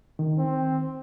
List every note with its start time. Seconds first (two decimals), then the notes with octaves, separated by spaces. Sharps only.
0.19 D#3
0.38 C4